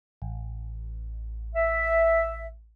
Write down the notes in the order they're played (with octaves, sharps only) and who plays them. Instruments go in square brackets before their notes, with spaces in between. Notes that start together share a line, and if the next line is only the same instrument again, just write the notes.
[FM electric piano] A1
[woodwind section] E5